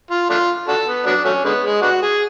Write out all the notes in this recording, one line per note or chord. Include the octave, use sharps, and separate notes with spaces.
F4
A3 D4 F4
D4 F#4 A4
B3
F#3 B3 D4
F#3 A3 C#4
D3 G#3 B3
G#3
B3 D4 F#4
G#4